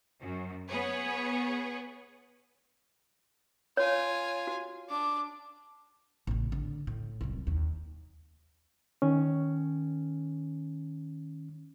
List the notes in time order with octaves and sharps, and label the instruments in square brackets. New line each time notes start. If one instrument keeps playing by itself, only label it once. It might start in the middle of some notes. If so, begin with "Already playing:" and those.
[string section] F#2
B3 G#4 B4 C#5
[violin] F4 G#5 [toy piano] C#5
[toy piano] F#4
[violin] D4 D6
[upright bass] A1 C#3
D3
A2
D1 C2
D#2
[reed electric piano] D#3 C#4